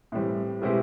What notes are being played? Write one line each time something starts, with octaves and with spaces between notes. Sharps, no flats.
A2 E3 G3 C4
B2 G#3 C4 E4 G4